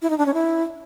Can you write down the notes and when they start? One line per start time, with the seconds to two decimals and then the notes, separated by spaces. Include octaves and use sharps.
0.02 E4
0.10 D#4
0.18 D4
0.26 C#4
0.34 E4